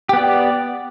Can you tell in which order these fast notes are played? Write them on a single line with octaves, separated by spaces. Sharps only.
G4 B3 D5